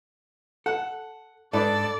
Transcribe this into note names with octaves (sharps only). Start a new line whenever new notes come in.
A4 F#5
G#2 D4 A4 B4 D5